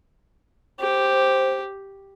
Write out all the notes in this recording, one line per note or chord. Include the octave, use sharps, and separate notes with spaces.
G4 C5